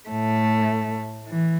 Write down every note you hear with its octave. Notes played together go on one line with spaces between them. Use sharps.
A2 A3
E3